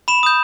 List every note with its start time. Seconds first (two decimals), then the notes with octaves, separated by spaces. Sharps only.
0.08 B5 E7
0.23 D#6 G6